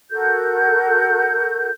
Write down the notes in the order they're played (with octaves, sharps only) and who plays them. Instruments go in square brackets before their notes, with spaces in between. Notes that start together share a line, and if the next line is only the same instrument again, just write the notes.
[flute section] F#4 A4 A#4 G6